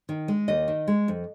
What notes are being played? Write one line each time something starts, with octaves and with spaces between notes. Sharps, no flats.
D#3
G#3
D#2 D#5
D#3
G#3
F2